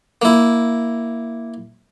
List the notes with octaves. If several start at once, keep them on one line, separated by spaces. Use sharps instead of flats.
A#3 E4